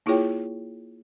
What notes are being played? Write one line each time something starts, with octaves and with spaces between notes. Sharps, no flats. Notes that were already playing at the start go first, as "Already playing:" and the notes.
A#3 E4 F4 G#4 C#5 G5